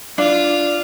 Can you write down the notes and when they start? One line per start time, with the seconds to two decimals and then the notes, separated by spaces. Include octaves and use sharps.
0.18 D4 F4